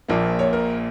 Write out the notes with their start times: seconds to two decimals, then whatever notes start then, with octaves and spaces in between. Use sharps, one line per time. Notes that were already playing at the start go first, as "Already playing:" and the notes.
0.08 A#1 A#2 F3 A#3
0.39 C#5
0.53 A#4